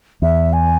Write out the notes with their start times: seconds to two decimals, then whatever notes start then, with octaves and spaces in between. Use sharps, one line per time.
0.22 E2 E5
0.53 G#5